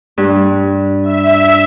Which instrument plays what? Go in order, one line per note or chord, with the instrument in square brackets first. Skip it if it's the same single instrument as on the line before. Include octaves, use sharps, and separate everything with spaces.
[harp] G2
[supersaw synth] E5